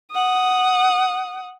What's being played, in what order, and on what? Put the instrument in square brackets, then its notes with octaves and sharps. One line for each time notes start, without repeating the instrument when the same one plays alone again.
[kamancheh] F#5 D#6